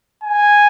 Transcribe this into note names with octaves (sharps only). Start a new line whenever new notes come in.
G#5